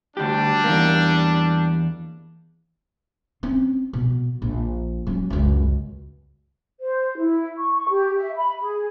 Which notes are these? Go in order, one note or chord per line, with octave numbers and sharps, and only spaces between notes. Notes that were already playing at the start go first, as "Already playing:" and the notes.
D2 G3 D4 G4
E2 A#3
C4 C#4
B2
A#1
F#3 C#4
C#2 F#2
C5
E4
C#6
C#6
G4
E5
B5
G#4